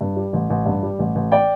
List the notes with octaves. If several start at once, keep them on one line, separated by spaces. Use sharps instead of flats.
G2
G3
A1
A1
G2
G3
A1
A1
D5 G5